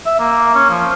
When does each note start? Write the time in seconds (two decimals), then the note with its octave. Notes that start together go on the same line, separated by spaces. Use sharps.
0.06 E5
0.20 A#3
0.55 C#4
0.70 F3